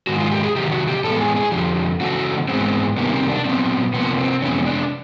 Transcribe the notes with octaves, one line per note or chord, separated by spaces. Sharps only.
G#2 D#3 G#3 F#4
F4
G4
G#4
C3 D#3 F#3 G4
F#4
G4
A2 E3 G#3 B3 A4
G#4
G#4
F2 D3 F3 G4
C#3 E3 A3 F#4
G#2 E3 G#3 B3 C4
C3 D#3 G3 A#3 B3
C4
D4
A#2 F#3 B3 C4
C3 F3 A#3 B3
C4
F2 C3 E3 G#3 B3 C#4
D4